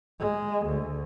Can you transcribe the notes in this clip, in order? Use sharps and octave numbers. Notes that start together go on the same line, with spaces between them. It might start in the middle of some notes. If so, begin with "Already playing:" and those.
G#3
D2